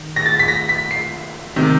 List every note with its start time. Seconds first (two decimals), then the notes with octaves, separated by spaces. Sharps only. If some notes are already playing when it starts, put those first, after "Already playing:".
Already playing: D#3
0.16 A#6
0.26 A6
0.39 B6
0.48 A#6
0.69 B6
0.91 C7
1.56 C3 D#3